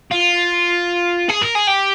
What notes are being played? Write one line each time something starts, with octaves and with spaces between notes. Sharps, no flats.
F4
G#4
A#4
G#4
G4